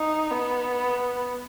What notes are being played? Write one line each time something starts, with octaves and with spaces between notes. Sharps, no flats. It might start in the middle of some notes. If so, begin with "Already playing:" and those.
Already playing: D#4
B3